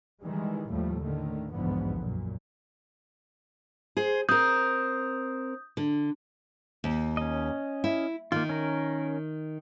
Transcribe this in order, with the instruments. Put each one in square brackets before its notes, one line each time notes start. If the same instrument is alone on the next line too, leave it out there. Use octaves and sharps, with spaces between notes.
[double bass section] D#3 E3 G3 G#3
D#2 A2 F3 G3 A3
A2 D3 D#3 A3
B1 E2 G#2 D3 F3 B3
F#2 A#2
[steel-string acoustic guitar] G#4 C5
[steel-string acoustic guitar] C4 A#4 [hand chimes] D#6 G6
[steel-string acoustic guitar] D3
[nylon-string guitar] D#2
[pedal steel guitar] C#4 D#5
[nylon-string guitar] E4
[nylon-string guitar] D#3 [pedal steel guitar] A#3 F4
[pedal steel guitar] C#4 A#4